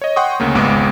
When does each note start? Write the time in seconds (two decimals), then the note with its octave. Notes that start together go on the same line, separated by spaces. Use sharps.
0.01 C#5 D#5
0.16 F#5 G5 C6 C#6 D#6
0.40 D2 C#3 A#3
0.55 G#1 C#2 G#3 B3 D6 D7